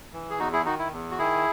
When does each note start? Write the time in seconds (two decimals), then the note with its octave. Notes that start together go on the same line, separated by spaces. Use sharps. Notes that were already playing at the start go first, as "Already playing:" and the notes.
0.13 E3
0.30 G#4
0.39 E2 D#4 F#4
0.53 E4 G#4
0.65 D#3 D#4 F#4
0.79 E4
0.92 E2
1.11 F#4
1.18 D#3 E4 G#4